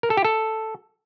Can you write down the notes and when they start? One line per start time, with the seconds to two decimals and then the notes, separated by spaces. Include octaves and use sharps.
0.03 A#4
0.10 A4
0.17 G4
0.25 A4